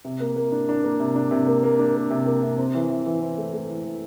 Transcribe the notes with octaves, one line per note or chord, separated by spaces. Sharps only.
C3
A#3
A#3
D4
D4
A#3
C3
D4
C3
A#3
A#3
D4
A#3
C3
A#3
C3
C4
E3
E3
E3
C4
A3
A3
E3
E3